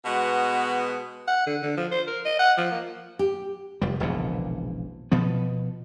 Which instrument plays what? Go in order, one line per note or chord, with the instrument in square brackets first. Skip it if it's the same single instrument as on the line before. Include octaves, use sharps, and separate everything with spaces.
[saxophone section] B2 G#3 B3 [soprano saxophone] F#4
[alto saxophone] F#5
D3
D3
F3
C5
A#4
D#5
F#5
F3
A#3
[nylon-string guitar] G4
[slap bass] F1 G3
E1 A#1 A#2 C#3
B2 F3 B3